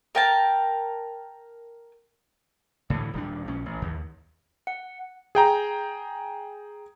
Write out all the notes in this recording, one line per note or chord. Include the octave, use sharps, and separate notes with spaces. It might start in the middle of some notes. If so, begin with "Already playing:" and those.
A#4 G5 A5
A2 D3 E3
D#1 G3 D4
A#1 C#4
A1
D#2
F#5
G#4 G5 A#5